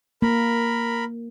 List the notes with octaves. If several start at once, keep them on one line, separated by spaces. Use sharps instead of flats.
A#3 A#4 B5